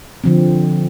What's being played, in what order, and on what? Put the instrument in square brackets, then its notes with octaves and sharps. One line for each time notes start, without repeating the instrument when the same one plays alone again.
[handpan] D3 F3 C4